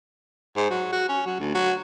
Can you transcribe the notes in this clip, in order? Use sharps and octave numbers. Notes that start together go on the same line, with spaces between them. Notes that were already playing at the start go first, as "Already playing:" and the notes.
G#2
F#3
F#4
C#4
F#3
D2
F#3